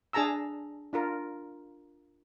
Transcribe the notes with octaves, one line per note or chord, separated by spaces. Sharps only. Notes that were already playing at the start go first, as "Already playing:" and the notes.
D4 G#4 A5 A#5 E6
D4 F4 A#4